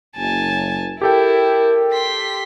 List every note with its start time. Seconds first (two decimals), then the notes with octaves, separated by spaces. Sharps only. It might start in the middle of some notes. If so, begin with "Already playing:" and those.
0.16 F#1 G#5 A5
1.02 E4 G4 A4 A#4 G5
1.93 C6 B6